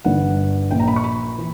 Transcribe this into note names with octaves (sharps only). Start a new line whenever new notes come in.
G1 G2 D3 F#5
A#1 A#2 G5
A#5
B5
C#6
B5
E3